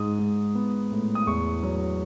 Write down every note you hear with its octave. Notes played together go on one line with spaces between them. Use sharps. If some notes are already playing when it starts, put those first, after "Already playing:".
Already playing: G#2 D#6
G#2
B3
A2
D#6
E2 C#6
F#3